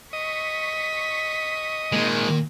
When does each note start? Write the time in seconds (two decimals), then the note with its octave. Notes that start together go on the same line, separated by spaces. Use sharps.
0.13 D#5 C#6 B6
1.92 A#2 D#3 G#3 A#3